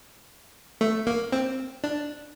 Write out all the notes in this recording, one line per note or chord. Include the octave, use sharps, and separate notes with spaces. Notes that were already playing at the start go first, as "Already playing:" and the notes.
A3
A#3
C4
D4